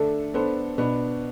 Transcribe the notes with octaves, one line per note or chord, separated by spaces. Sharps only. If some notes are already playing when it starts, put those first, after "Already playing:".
Already playing: D3 A3 D4 A4
B3 D4 A4 C5
B2 B3 D4